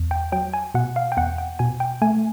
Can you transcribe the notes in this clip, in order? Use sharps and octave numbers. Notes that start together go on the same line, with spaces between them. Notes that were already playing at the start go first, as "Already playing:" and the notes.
Already playing: E2
G5
F#3 G5
G#5
B2 F#5
F5
G5
E2 F#5
G5
B2 G#5
G5
A3 G#5